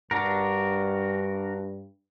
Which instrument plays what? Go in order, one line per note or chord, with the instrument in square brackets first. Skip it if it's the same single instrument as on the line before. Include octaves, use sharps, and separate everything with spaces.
[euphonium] G2 [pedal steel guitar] D4 F#4 A#4